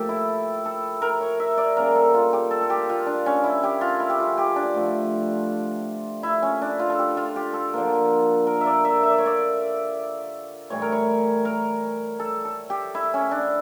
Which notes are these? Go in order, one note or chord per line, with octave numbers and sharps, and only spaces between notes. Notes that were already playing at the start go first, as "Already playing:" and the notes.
Already playing: A2 F3 A#3 G4 A4
E4
A4
A#4
C#5
E5
D5
C#3 G3 A#3 A#4
A4
F4
G4
A4
A4
G4
F4
D4
C#4
E4
G4
F4
E4
G4
F4
G4
D4
D3 F3 A3
E4
C#4
D4
F4
A4
G4
F4
G4
A4
D3 F3 A#3
A#4
E5
D5
E5
E5
D5
C#5
D5
A2 E3 G3 C#5
A#4
C#5
A#4
A4
A4
G4
E4
C#4
D4